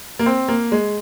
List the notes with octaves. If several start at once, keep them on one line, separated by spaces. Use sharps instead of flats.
A#3
C4
A#3
G#3